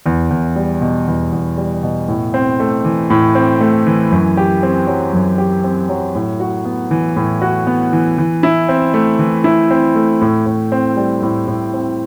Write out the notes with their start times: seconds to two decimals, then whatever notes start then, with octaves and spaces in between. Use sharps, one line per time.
0.06 E2
0.30 E2
0.56 G3
0.81 B2
1.08 E2
1.32 E2
1.58 G3
1.83 B2
2.08 A2
2.34 C4
2.60 A3
2.85 E3
3.10 A2
3.35 C4
3.61 A3
3.86 E3
4.11 F#2
4.37 G4
4.63 C4
4.87 F#3
5.13 F#2
5.38 G4
5.64 C4
5.89 F#3
6.15 A2
6.40 F#4
6.65 B3
6.91 E3
7.16 A2
7.42 F#4
7.67 B3
7.93 E3
8.18 E3
8.43 E4
8.69 C4
8.94 A3
9.19 E3
9.44 E4
9.71 C4
9.95 A3
10.21 A2
10.46 A2
10.72 C4
10.97 G3
11.22 A2
11.47 A2
11.73 C4